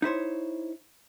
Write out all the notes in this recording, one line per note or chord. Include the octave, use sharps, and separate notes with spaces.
D#4 E4 C5 C#5